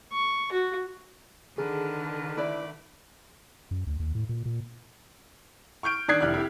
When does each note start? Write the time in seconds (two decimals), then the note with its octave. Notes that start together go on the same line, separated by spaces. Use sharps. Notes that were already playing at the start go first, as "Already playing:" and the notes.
0.12 C#6
0.52 F#4
1.58 D3 D#3 G#4 A#4 B4 A5
2.37 A3 E4 B4 D5 B5 D6
3.71 F#2
3.87 D2
4.00 D#2
4.15 A2
4.29 A#2
4.46 A#2
5.83 C#6 F6 G6 D7
6.08 D#3 D4 D#6 F#6 G#6 C7
6.20 F1 E4 D5 F6 F#6
6.34 E4 G4